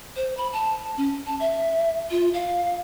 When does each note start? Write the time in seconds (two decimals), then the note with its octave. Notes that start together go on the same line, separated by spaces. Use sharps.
0.16 C5
0.37 B5
0.53 A5
0.97 C#4
1.26 A5
1.40 E5
2.11 F4
2.34 F5